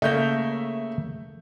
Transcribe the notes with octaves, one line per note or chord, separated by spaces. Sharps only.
C#3 A3 A#3 E5 G6 G7